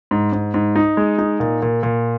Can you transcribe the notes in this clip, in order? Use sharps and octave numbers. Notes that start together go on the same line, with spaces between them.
G#2
G#2
G#2
D#4
G#3
D#4
A#2
A#2
A#2